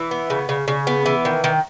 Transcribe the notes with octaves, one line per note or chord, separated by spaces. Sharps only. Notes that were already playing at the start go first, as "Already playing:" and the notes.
Already playing: E3
B3
C#3
C#3
C#3
B3
E3
D#3
D#3